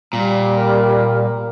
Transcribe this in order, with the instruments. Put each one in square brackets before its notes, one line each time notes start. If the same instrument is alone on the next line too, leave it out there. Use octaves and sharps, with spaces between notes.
[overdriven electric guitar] A#2 [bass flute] G3
[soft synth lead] A#4